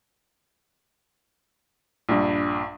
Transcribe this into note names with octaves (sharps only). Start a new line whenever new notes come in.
A#1 G2